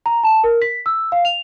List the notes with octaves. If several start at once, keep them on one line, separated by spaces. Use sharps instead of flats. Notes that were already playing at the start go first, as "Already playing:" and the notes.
A#5
A5
A#4
B6
E6
F5
F7